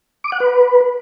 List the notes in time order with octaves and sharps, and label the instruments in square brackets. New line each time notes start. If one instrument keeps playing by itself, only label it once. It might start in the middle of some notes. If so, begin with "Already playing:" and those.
[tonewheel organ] D6
F#5
B4